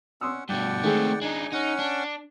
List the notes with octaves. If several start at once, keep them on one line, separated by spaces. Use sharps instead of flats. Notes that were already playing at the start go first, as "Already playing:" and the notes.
C#4 F#5 C6 D#6 E6
G2 B2 D5 F#5 G5
D#3 G#3 A3 C4 G#4
D4 D#4 G#5
C#4 D#4 F#5
D4